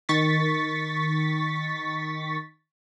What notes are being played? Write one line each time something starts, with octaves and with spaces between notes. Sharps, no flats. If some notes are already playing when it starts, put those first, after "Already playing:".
D#3 C#6 A6 B6